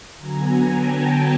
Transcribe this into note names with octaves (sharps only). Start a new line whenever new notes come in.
D3 F#3 B3 G#5 A#5
G5 A5